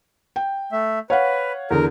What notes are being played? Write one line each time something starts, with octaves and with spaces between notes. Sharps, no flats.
G5
A3 E5
B4 C#5 F5 F#5
E2 D3 A#4